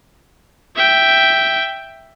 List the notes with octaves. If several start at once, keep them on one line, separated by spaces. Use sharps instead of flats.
E5 G5